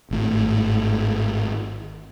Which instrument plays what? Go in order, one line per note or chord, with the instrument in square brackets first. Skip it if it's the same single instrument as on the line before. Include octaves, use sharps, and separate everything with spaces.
[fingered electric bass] G#1 A2